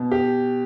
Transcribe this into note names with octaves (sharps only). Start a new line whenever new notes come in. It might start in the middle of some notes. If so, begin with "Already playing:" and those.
Already playing: B2
G4